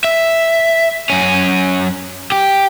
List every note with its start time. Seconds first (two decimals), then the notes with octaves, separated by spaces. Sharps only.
0.04 E5
1.10 F#2 C#4
2.32 G4